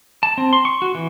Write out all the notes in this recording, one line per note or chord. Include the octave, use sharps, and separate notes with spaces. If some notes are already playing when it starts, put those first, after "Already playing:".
A5
C4
C6
C#6
F#4
E3